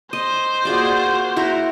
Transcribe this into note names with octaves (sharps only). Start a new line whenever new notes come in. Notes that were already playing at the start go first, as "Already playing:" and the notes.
C5 D#5
A#3 F4 F#4 G#4 D5
E4 F#4 A#4